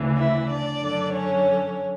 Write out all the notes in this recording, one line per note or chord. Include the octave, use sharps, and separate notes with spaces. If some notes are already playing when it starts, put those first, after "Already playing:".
Already playing: D2 C#3 E3
E4 E5
D4 D5
F#2 D3
C#4 C#5